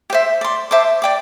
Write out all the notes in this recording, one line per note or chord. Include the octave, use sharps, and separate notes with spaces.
G4
C5 E5
D5 C6
C5 E5 A5 D6
D5 G5 D6